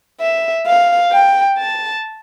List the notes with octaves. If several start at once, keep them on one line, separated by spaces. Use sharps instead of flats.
E5
F5
G5
A5